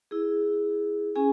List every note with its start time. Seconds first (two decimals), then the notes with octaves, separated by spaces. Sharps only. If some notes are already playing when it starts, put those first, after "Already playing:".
0.11 E4 G#4
1.15 C#4 G#4 G#5